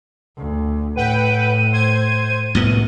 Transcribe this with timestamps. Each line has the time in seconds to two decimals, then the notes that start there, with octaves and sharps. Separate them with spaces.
0.38 D2
0.96 A2 B4 F#5 G5 D#7
1.72 C5 G#6
2.55 C2 F#2 A2 B3